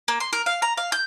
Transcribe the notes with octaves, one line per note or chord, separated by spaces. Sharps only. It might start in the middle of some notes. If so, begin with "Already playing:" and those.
A#3
C6
A#4
F5
A#5
F5
G6